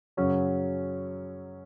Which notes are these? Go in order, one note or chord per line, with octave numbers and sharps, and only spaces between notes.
F#2 C#3 F#3 C#4